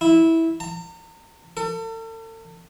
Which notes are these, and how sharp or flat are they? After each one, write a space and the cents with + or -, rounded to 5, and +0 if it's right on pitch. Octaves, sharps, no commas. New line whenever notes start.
E4 -15
A#5 -40
A4 +40